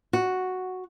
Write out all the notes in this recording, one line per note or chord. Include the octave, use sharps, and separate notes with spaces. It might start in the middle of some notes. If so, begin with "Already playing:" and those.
F#4